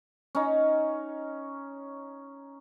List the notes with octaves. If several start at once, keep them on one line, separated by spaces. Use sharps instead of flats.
C#4 D#4